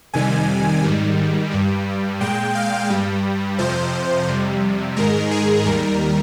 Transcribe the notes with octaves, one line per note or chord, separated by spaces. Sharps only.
F2 C3 D#3 G3 G#5
G#2 D#3 G3
G2 G3
A#2 G#3 G5
F5
G2 G3
F2 C3 F3 C5
F2 C3 G3
G#2 D#3 G#3 A#4
G#4
D#2 D#3 G3 A#4